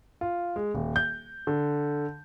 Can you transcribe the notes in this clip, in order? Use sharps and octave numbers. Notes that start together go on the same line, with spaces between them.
F4
G#3
D#1
G6
D3